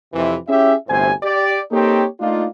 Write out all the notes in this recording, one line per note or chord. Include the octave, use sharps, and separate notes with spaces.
F2 C3 E3
C#4 E4 G4 G#4 E5
G1 D2 A2 C3 C5 G#5
G4 D5
A#3 C4 D#4 G4 A4 C#5
A3 A#3 D4 D#4 F4